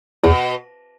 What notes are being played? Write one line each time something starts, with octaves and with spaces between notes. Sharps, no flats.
E2 B2